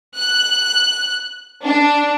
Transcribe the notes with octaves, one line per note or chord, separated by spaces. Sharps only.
F#6
D4